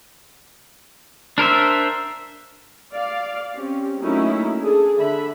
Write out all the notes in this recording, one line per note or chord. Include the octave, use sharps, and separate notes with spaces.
D4 A#4 C5 E5
D5 F5
C4 C#4 G4
F#3 A3 A#3 C#4 D#4 E4
D4 G#4 A4
D3 E5 B5